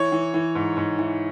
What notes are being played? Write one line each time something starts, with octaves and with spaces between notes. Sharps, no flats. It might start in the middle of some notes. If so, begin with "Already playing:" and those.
Already playing: E3 C#5
E3
E3
G#2
G#2
E3